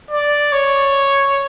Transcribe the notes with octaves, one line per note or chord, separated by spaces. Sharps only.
D5
C#5